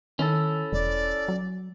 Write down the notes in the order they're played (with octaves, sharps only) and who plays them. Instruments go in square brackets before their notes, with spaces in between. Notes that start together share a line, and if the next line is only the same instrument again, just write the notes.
[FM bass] D#3 [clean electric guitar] C#4 E4 A4
[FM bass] E1 [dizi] D5
[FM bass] F#3